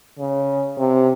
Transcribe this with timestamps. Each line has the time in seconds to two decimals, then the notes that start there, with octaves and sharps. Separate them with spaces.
0.18 C#3
0.78 C3